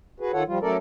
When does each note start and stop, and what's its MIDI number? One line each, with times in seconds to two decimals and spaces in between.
0.20 0.32 66
0.20 0.32 68
0.20 0.32 71
0.33 0.43 51
0.33 0.43 65
0.33 0.43 69
0.33 0.43 73
0.33 0.43 78
0.47 0.59 53
0.47 0.59 55
0.47 0.59 65
0.62 0.77 54
0.62 0.77 57
0.62 0.77 61
0.62 0.77 69
0.62 0.77 70
0.62 0.77 74